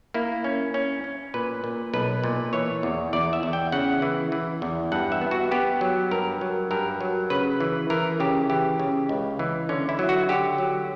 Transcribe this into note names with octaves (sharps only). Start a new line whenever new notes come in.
A#3 E4
C#4
C#4
C#4
A#2 B4
A#2
B1 B4
A#2
E3 C#5
E2
E2 D5
E5
E2
G5
C#3 F#5
E3
E3
E2
G2 F#5
E5
B3
F#4
B3 G4
F#3
G2 A#4
F#3
G2 A#4
F#3
C#3 B4
E3
E3 A#4
C#3 G4
E3 G4
C#3
C#2
E3
D3 C#4
E4
F#3
F#4
D3 G4
F#3